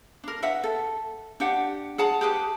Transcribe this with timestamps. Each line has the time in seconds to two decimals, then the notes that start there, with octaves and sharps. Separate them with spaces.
0.24 D4 A#4
0.42 B4 E5 F#5
0.64 A4
1.40 D4 G4 F#5
1.98 G#4 F#5 A5 A#5
2.21 G4 G#4 B4 A5